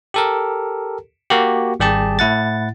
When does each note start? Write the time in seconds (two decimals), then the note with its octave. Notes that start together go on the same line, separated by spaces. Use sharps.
0.14 G4 A4 A#4
1.30 A#3 F#4 G4
1.80 G#1 G3 G4 G#4 A5
2.19 A2 E4 F#5 A6